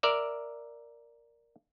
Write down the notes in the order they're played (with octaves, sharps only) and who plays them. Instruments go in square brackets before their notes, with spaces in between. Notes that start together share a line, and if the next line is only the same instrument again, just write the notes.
[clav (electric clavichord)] A#4 D5 E5